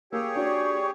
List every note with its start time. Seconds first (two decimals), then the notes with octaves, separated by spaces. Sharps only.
0.12 A#3 G4 G#4 C#5 E6
0.36 D4 F#4 D5 C#6